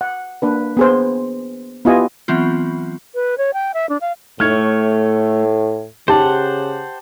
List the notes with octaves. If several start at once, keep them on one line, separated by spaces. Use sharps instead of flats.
F#5
A#3 D4 B4
B3 G#4 C5
B3 E4 F4 G4 D#5 G#5
E3 F#3 B3 C4 F4
B4
C#5
G5
E5
D4
F5
A2 A3 C#5 F6 G#6
C#3 G4 C5 F#5 A5